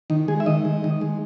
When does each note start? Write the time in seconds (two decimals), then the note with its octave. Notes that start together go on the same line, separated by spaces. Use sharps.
0.10 D#3 D#4
0.28 G#3 G#4
0.40 E5
0.46 D#3 D#5
0.65 G#3
0.84 D#3
1.01 G#3